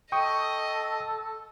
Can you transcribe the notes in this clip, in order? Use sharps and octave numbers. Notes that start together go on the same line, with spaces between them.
A4 D#5 G5 C#6 D#6